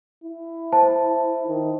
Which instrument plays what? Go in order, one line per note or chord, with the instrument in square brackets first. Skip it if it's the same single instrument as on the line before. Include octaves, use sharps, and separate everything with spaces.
[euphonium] E4
[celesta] C5 A5
[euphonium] D#3